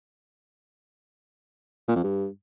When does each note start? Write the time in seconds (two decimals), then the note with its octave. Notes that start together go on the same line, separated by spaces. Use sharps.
1.88 A#2
1.96 F2
2.03 G2